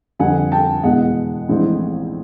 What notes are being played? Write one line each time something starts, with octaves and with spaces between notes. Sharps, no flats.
F2 D3 G3 F#5 G#5
G5 A5
E2 B2 G#3 F#5
A#1 A2 E3 G#3 C4